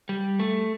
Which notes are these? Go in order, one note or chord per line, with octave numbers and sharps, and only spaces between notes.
G3
A3